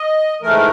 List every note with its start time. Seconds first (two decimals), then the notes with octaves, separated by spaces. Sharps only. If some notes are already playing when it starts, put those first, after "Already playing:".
Already playing: D#5
0.42 G#2 E3 A3 A#4